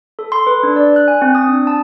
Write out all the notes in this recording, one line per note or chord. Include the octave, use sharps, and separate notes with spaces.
A4
C6
B4
D4
D5
F#6
G#5
C4
D#6
D4
A5